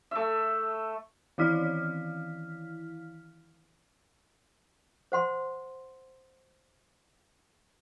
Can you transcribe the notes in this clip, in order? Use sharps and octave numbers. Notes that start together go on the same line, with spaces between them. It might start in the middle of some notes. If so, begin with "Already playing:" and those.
A3 E5
D#3 E3 E4 F5 F6 B6
C5 F#5 C6